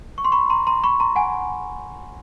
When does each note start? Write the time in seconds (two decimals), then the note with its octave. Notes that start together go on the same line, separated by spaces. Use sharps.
0.18 C#6
0.24 C6
0.32 B5 C#6
0.50 A#5 C6
0.67 A#5 C6
0.84 B5 C#6
1.00 A#5 C6
1.16 F#5 G#5